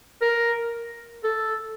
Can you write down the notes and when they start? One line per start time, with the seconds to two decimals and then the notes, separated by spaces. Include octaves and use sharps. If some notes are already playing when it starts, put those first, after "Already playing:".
0.22 A#4
1.24 A4